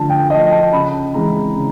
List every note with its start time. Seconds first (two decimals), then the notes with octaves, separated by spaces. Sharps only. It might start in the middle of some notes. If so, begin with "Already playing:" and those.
Already playing: D3 F3 A3 A5
0.10 G5
0.30 F3 A3 D#5
0.51 A5
0.73 C#3 B5
1.14 E3 G#3 C4 A#5
1.56 C#3